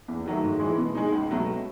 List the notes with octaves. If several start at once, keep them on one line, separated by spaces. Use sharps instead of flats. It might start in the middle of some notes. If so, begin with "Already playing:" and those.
E2
D#3 F#3 A3
G#2
E3 G#3
B2
G#3 D#4
C#2
B2 F#3 A3